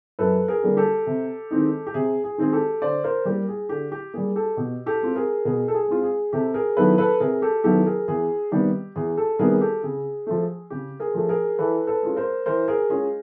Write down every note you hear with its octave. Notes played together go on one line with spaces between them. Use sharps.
F#2 A4 B4
G#4 A#4
D3 G3 A#3
G4 A4
C3
D#3 G#3 C4 D#4
G4
C3 G#4
G#4
D#3 G#3 C4 D#4 G#4
G4 A4
D3 C5 D5
A#4 C5
G3 A#3 G4
G#4
D3 G4
G4
G3 A#3 G#4
G4 A4
B2 G4
G4 A4
G#3 C4 F4
G#4 A#4
B2 G#4 A#4
A4
G#4
G#3 C4 F4
G#4
C3 G4 A4
G#4 A#4
D#3 F#3 B3 E4 A4 B4
A4 B4
C3 G#4 A#4
G4 A4
D#3 F#3 B3 E4 G4 A4
G#4 A#4
E2 G#4
C3 D#3 G3 B3 G4
E2 G#4
G4 A4
C3 D#3 G3 B3 G#4 A#4
G4 A4
C#3 G#4
F3 A3
C#3 G4
G#4 A#4
F3 A3
G#4 A#4
E3 A4 B4
A4 B4
G#3 C#4 F4
A#4 C5
E3 A#4 C5
G#4 A#4
G#3 C#4 F4 G#4